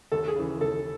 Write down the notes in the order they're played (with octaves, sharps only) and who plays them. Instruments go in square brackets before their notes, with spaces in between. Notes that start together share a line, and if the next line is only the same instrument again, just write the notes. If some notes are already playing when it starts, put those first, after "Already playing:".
[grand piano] D#2 [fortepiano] A4
[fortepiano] G#4
[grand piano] C#3 E3
[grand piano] D#2 [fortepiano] A4